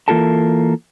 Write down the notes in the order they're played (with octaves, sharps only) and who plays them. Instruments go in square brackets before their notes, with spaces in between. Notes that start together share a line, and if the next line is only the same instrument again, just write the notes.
[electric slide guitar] E3 A#3 F4 A4 A#4 A5